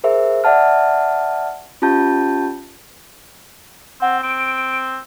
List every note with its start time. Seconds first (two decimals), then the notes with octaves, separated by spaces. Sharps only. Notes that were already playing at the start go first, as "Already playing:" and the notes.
0.04 G#4 A#4 C5 E5
0.44 D5 E5 F#5 A5 F6
1.82 C#4 F4 G4 A5 G6
4.02 C4 F#5
4.23 C4 D7